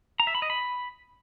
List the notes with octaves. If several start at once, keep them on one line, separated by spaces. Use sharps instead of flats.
A#5
E5
B5
D#5
B5